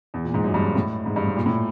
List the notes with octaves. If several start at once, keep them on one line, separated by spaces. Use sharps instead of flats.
E2
A#2
G#2
F#2
G2
G#2
A2
G#2
G2
G#2
A#2
A2